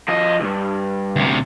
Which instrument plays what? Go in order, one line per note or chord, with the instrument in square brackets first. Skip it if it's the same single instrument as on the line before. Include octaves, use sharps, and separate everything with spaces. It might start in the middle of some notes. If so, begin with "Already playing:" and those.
[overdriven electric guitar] F3 D#5
C#2 G2
[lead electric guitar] D2 C3